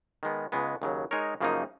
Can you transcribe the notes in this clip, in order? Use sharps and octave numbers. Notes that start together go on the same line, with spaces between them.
D#3 G#3 B3
C#2 C#3 G#3 B3
D#2 C#3 F#3
G#3 D#4 A#4 C#5
F#2 C#3 F3 A#3 D#4